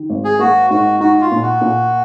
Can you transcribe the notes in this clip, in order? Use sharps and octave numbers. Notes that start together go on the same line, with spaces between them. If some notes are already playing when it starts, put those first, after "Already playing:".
Already playing: D#3
G#1
G#4
A#3 F#4
G#2 F#4
D#4 F#4
F4
A#2
F#4
A#2